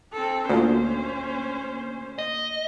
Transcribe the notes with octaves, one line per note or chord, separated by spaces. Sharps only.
C4 A4
D2 A#2 C#4 C5
D#5